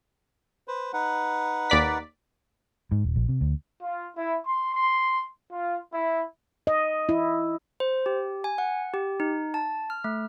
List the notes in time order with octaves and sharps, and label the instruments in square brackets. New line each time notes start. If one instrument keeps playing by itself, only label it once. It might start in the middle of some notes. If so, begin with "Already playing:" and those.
[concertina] B4 C5
D#4 B4 F#5
[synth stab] D#2 D5 B6
[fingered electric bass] G#2
D#1
A#1
C3
D2
[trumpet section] F4
E4
C6
C6
F4
E4
[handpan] D#5
E4
[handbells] C5
G4
G#5
F#5
G4
D#4
A5
F6
A3